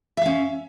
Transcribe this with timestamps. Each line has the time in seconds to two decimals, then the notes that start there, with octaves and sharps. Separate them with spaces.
0.17 E5
0.21 F5
0.26 C#4